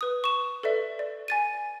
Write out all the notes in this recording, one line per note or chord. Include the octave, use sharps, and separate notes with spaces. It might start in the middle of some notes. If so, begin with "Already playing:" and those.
B4 D#6
C#6 E7
A4 B4 D5 E5
D5
G#5 A6 D#7